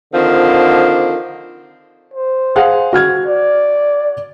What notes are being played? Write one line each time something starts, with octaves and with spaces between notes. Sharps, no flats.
D3 D#3 F3 C4
C5
G#4 F5 F#5
F#4 F6 G#6
D5